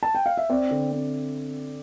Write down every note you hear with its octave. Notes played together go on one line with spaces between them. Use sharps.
A5
G5
F5
E5
C4 D5
D3
C4